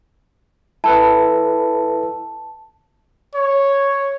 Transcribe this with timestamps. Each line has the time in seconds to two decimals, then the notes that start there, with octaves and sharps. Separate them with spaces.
0.84 E4 A4 B4 A5
3.35 C#5